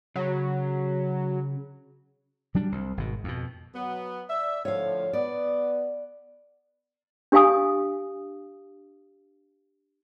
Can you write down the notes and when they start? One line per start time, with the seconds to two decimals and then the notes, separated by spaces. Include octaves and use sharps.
0.16 C#3 F#3
2.54 F#3 G3 D4
2.72 C2
2.97 G#1 B2
3.24 F2 B2
3.75 F#3 B3
4.30 D5 E5
4.65 A2 D3 F3 C#5 F5
5.13 B3 D5
7.32 D4 G4 D#5 F5 G#5 D#6